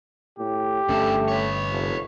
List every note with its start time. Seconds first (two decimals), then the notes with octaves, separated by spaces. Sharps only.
0.38 A2 G4
0.88 G1 G2 A3 C#4 A4
1.28 B4 C#5
1.71 F1